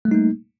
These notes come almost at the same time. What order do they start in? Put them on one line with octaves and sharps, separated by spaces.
A3 G3 D#4 A#3